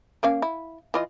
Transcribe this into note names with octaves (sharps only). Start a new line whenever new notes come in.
A#3 C#4 F5
E4
E3 F4 D#5